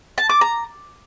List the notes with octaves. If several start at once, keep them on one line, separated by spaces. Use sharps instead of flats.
A5
D6
A#5